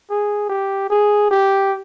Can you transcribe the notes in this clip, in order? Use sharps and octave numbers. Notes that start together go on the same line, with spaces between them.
G#4
G4
G#4
G4